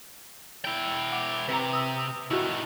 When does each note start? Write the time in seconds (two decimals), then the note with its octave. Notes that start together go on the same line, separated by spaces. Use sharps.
0.65 E4 G5
1.12 F#5 D6 F7
1.48 C3 B4 A#5
1.73 D#6 E6
2.31 A2 D#3 E4 F#4